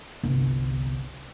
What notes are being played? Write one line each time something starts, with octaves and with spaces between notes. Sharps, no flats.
G1 C2